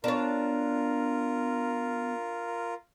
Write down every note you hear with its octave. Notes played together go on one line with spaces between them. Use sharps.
B3 D4 F4 A#4 C#5